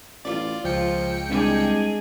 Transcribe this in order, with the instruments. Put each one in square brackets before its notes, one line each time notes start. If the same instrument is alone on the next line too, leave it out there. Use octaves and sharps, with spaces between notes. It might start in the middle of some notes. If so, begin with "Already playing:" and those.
[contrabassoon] A1 [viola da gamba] F4 [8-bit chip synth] D5
[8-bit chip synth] C#2 G5 C#7 [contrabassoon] F3
[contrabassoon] C2 [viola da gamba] G#3 D4 G#4